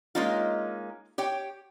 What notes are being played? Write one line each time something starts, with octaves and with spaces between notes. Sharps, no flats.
G#3 A#3 C#4 D#4 F4
G4 C#5 G5